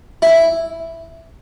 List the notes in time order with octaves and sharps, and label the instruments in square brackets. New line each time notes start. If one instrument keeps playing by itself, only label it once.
[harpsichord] E4